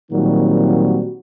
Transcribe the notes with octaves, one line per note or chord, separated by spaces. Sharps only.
A#2 D#3 F#3 G3 C4 F#4